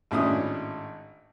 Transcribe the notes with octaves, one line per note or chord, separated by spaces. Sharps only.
G#1 A2 C#4 D4 D#6